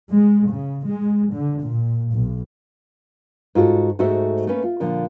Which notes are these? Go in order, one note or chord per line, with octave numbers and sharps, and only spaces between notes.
G#3
C#3
G#3
D3
A#2
B1
G#2 F4 F#4 G#4 A4
G#2 A3 F#4 A4 C5 E5
A3 A#3 C#4 B4
F4
A#2 D3 F3